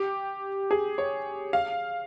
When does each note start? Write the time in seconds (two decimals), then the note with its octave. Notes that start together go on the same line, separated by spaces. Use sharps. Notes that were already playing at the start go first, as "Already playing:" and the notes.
Already playing: G4
0.71 G#4
0.98 C#5
1.53 F5